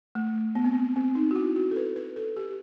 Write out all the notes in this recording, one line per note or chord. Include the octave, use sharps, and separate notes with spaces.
A3
B3
C4
B3
C4
D#4
F#4
E4
F#4
A4
B4
B4
A4
G4